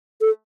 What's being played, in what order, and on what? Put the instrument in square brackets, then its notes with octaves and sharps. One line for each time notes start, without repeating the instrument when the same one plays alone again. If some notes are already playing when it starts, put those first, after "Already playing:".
[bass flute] A4